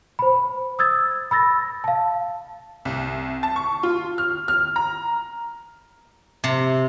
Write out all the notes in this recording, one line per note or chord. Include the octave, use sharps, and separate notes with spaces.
C5 B5
D#6 E6 G#6 A6
B5 E6 A6 A#6
F5 A5
C2
A5
C#6
F4
F6
F6
A#5
C3